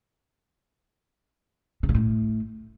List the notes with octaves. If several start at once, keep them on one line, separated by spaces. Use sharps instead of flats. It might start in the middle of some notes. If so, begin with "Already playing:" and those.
C#3
B2
A2